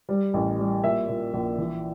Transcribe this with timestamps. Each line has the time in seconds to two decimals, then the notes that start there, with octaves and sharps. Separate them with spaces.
0.09 G3
0.34 A1
0.59 G3
0.84 A#2 E5
1.08 A#2
1.33 A#1
1.58 E3